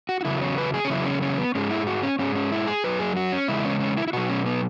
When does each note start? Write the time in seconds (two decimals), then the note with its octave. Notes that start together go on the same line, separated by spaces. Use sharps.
0.09 F#4
0.21 F#4
0.25 E2 C#3 F#3 E4
0.41 C#4
0.58 B4
0.74 G#4
0.85 C#4
0.90 E2 C#3 F#3 E4
1.06 C#4
1.22 C#4
1.38 B3
1.55 G#2 G#3 C#4
1.70 E4
1.87 F#4
2.03 C#4
2.19 G#2 G#3 C#4
2.35 C#4
2.52 E4
2.67 G#4
2.84 F#2 F#3 B4
2.99 G#4
3.16 F#4
3.32 C#4
3.48 E2 C#3 G#3 E4
3.65 C#4
3.80 C#4
3.97 E4
4.08 E4
4.13 B2 F#3 F#4
4.29 C#4
4.46 B3